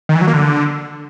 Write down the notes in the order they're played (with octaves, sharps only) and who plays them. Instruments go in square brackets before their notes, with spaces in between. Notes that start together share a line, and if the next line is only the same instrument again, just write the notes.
[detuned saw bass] D#3
E3
F#3
A#3
D3